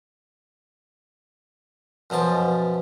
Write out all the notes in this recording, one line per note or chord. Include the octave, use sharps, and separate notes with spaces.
F#2 B2 F3 A5